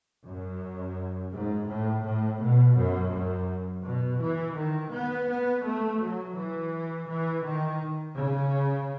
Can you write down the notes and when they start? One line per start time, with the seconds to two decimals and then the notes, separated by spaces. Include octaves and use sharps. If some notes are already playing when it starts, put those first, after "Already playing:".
0.25 F#2
1.32 G#2
1.68 A2
2.04 A2
2.40 B2
2.76 F#2
3.12 F#2
3.84 B2
4.21 E3
4.56 D#3
4.93 B3
5.28 B3
5.65 A3
6.00 F#3
6.36 E3
7.09 E3
7.44 D#3
8.17 C#3